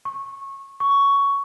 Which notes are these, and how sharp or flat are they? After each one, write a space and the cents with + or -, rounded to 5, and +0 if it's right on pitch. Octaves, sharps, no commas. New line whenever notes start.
C#6 -20
C#6 +10